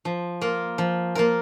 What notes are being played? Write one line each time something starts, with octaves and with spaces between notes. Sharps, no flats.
F3
A#3 F4 A#4
F3
A#3 F4 A#4